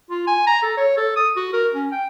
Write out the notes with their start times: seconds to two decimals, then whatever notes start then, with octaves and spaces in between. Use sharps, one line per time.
0.10 F4
0.27 G#5
0.47 A#5
0.63 A4
0.77 C#5
0.97 A4
1.16 D#6
1.36 F#4
1.53 A#4
1.74 C#4
1.92 G5